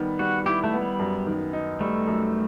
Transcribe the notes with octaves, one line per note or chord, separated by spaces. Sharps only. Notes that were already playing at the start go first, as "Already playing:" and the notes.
Already playing: D#3 G3 B3
G3 F#4
E4 G4
A3
B3
G3
F#2
D#3
D#4
G3 A3
F#2